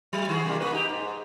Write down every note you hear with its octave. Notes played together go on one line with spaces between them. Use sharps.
F#3
D#3 F#4 G#4
C3 G3 A#3
A#3 F#4 B4
D#4 G4
G#2